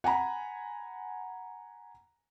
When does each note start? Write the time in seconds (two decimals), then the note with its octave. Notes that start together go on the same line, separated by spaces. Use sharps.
0.04 F#5 G#5 A#5 B5